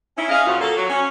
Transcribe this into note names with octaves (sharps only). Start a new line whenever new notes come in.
C#4 D#4 E4
C#4 G#4 D#5 F5
F#2 A#2 F3 C#4 F4 F#4
A#3 A4
F#3
C#4